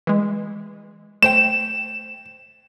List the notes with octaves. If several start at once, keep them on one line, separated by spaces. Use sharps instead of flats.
E3 G#3
A3 C5 G5 E7